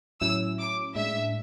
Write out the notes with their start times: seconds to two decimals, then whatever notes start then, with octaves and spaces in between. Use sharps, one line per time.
0.21 A2 F#3 C#4 E4 E6
0.59 D6
0.96 A2 G#3 D4 E5